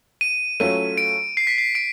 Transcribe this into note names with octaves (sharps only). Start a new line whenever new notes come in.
D#7
F#3 A3 C#4 F4 D#7
D7
C7
B6
C7
D7